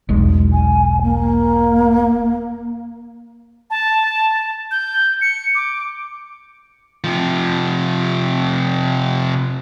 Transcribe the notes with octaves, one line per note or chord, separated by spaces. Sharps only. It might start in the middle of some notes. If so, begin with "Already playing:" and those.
E1 B1 G#3
G#5
A#3
A5
G6
C#7
D6
C3 F3